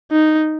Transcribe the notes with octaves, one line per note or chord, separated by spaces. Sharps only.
D#4